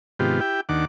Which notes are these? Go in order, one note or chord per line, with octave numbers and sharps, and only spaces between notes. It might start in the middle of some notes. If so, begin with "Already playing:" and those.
G#2 C3 D#3 B3 F4 G4
E4 G4 G5
D#2 D#3 D4 F#5 D6